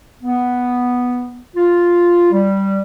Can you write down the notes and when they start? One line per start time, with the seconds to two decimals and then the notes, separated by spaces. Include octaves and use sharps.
0.22 B3
1.55 F4
2.32 G3